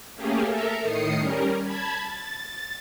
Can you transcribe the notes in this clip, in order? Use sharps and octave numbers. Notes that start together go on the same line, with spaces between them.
A3 A#3 C#4 G4 G#4
A4 A#4 E5 A#5
A2 D#3 D#6 C7 C#7
G3 C#4 A#4
A5 B5 G#6
A6